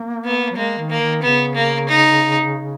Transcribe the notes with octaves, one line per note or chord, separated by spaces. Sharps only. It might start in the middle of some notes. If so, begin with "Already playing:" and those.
Already playing: A#3
B3
F#3
G#3 A#3
D#3
A#3
D#3
C#3 B3
A#3
D#4